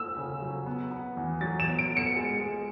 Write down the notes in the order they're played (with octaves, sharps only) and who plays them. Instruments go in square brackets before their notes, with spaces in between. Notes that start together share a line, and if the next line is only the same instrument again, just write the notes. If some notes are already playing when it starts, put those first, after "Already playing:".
Already playing: [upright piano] E6
[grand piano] C#3
F#3
B3
B3
E2
[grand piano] F#3 [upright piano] A6
[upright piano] E7
[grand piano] B3
[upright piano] D7
[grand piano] B3
[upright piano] C#7
[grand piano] G#3
G#3